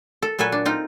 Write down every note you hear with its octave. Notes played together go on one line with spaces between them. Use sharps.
A4
A#2 F#3 A4 B4 G#5
D4
C4 D#4 F4